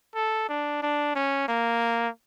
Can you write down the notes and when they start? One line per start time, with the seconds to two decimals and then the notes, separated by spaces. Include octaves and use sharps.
0.15 A4
0.49 D4
0.83 D4
1.15 C#4
1.48 A#3